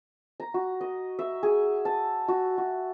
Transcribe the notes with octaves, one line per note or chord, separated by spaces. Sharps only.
A#5
F#4
D#5
E5
G#4
A5
F#4
F#4